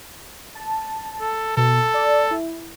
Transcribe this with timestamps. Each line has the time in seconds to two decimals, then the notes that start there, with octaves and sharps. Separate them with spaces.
0.55 A5
1.21 A4
1.57 B2 A4
1.94 D5
2.31 E4